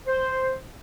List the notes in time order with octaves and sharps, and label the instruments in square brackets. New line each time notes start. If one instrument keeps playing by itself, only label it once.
[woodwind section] C5